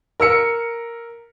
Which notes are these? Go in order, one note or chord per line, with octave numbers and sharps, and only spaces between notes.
A#4 E6 C#7